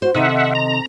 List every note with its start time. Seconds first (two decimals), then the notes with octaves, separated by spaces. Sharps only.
0.02 F#4 C5
0.15 C3 D#3 C4 D#4 A4 E5 F#5 A5
0.31 D#5
0.55 A#5